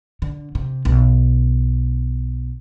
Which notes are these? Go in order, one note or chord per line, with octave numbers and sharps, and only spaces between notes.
D3
C3
B1